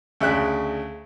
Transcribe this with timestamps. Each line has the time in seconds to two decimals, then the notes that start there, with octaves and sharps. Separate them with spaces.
0.20 D2 C#3 E5 F#6